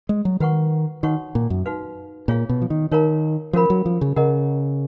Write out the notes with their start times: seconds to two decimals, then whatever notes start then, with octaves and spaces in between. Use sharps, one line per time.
0.09 G#3
0.25 F#3
0.40 D#3 F#4 B4 F#5 C#6
1.03 D#3 D#4 F#4 C#5 F#5 C#6
1.35 A#2
1.50 F#2
1.66 D#4 F#4 B4 F5
2.28 A#2 F4 G#4 C#5 F5
2.49 B2
2.62 F3
2.70 D#3
2.91 D#3 D#4 A#4 C#5 F5 A#5
3.53 F3 C#4 F#4 A#4 F5 B5
3.70 F#3
3.86 F3
4.01 C#3
4.16 C#3 A#4 D#5 F#5 A#5